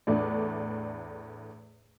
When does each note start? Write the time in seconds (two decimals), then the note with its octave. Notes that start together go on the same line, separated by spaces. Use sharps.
0.07 E2 A2 A3 D4